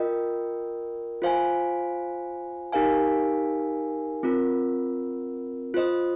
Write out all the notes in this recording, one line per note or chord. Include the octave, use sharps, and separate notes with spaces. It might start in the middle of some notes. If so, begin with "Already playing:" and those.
Already playing: F4 A#4 D#5 G5
F4 C5 F5 G#5
D#4 G4 A#4 F5 G#5
C4 F4 A#4
F4 C5 D#5